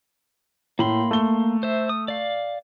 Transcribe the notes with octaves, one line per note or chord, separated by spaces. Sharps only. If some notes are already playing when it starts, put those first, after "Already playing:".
A2 A#3 B5 C6
A3 G7
C5 E5
D#6
D5 F5